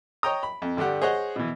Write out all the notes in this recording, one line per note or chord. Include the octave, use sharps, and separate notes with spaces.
C#5 D#5 G5 A#5 D#6
B5
F2
G2 D3 D4 G4 F#5
G#4 C5 C#5 D#5 F#5
B2 E3